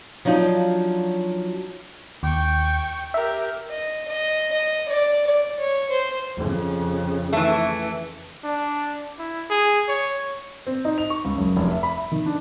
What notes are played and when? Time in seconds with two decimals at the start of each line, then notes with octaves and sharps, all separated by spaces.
0.25 F3 F#3 D4 D#4 F4
2.23 D#2 G5 C#6
3.14 G4 A#4 E5
3.70 D#5
4.08 D#5
4.52 D#5
4.88 D5
5.27 D5
5.59 C#5
5.90 C5
6.37 F2 C#3
7.33 E3 A3
8.44 D4
9.19 E4
9.50 G#4
9.88 C#5
10.67 C4
10.85 D#4
10.98 F7
11.10 C#6
11.25 C#2
11.38 F#1
11.56 F1
11.71 E5
11.83 B5
11.97 E5
12.12 D#3
12.26 D4